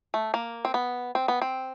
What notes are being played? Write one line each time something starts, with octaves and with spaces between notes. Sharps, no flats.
A3
A#3
C4
B3
C4
B3
C4